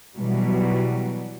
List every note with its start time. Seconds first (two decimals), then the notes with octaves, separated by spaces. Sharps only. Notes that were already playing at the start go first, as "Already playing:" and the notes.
0.17 B2 E3 F#3 G3